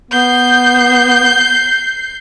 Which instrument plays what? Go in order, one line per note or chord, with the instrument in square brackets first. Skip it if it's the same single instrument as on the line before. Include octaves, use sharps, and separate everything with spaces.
[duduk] B3 [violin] G6 C7